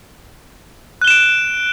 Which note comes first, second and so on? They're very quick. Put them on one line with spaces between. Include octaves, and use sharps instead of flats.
F#6 G7 E7 D7